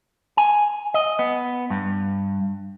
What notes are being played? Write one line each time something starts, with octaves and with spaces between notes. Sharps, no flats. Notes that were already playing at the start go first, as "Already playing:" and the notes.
G#5
D#5
B3
G2